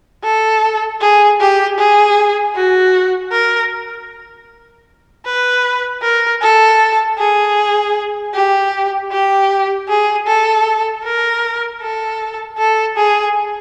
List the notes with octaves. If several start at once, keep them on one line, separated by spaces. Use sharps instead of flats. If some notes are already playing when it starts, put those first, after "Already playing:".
A4
G#4
G4
G#4
F#4
A#4
B4
A#4
A4
G#4
G4
G4
G#4
A4
A#4
A4
A4
G#4